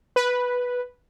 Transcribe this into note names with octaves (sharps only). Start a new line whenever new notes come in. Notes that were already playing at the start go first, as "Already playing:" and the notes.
B4